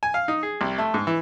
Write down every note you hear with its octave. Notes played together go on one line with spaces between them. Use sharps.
G#5
F5
D#4
G#4
C2
A3
G#2
E3